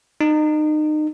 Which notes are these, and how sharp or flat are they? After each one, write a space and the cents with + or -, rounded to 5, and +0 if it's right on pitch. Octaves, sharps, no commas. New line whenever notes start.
D#4 -30